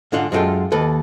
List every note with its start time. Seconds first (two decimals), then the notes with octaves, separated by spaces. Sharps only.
0.12 G#2 D3 F4 F#5
0.32 F#2 G#3 E4 F4 A4 G5
0.72 D#2 A4 B4